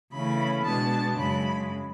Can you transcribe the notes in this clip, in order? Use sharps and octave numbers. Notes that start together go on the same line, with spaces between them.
C#3 E3 A3 C#4 B5
B2 G#3 B3 D4 A5
F#2 C#3 G#3 B5